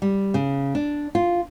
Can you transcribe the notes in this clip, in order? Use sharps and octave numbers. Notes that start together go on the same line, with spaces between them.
G3
C#3
D4
F4